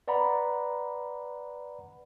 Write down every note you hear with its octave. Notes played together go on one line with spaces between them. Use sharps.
B4 D5 F#5 A#5 B5